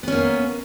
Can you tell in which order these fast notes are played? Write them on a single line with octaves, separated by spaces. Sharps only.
B3 C#4 A#3